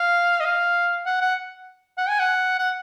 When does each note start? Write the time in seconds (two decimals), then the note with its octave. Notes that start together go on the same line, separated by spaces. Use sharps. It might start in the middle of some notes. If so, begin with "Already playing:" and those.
Already playing: F5
0.40 D#5
0.45 F5
1.06 F#5
1.21 F#5
1.98 F#5
2.09 G#5
2.20 F#5
2.59 F#5